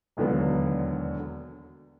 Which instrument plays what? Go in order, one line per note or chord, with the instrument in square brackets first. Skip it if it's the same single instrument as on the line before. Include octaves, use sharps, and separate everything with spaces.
[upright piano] E1 D#2 D3 F#3 B3